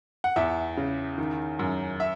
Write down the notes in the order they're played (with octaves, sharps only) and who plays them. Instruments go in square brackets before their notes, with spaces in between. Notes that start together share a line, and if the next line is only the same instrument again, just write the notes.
[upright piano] F#5
E2 E5
C#3
D#3
F#2
E5